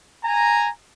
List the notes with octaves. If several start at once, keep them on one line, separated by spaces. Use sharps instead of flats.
G#5 A#5